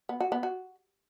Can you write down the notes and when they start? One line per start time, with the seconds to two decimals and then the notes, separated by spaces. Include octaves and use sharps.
0.09 B3
0.20 F#4
0.32 B3
0.43 F#4